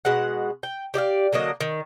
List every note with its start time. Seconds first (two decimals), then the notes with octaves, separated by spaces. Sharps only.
0.05 B2 G#3 F#5
0.63 G5
0.94 G4 D5 D#5 F5
1.33 D3 F#3 A#3 D#5
1.61 D#3